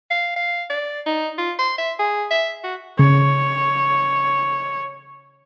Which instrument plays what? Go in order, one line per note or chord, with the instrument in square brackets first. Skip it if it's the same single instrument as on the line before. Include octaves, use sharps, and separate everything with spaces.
[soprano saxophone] F5
F5
D5
D#4
F4
C6
E5
G#4
E5
F#4
[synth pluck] C#3 [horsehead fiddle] C#5